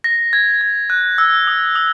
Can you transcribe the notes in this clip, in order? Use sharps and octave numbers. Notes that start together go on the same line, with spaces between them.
A#6
G#6
G#6
F#6
E6
D#6
D#6